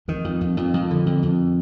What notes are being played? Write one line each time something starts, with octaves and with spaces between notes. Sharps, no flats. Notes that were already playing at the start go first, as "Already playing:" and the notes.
F2 D#3
F2
F2
F2
F2
D3
F2
F2